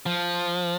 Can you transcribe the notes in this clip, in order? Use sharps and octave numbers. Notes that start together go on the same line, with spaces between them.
F3